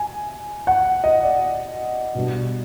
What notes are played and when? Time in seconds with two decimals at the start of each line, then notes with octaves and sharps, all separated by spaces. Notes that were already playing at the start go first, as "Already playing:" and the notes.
Already playing: G#5
0.67 F#5
1.04 D#5
1.23 D5
2.15 B2 G3 B3 D4